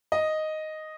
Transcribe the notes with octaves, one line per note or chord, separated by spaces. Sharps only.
D#5